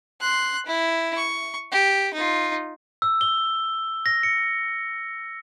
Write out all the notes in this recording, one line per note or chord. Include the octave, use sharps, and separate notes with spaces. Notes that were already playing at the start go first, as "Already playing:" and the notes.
C6 F#6
E4
C#6
G4
D#4 F4
E6
G7
A#6
C#7